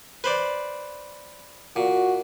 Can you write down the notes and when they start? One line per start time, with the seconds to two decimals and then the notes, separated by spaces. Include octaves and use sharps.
0.24 B4 C5 D5
1.76 A#2 F#4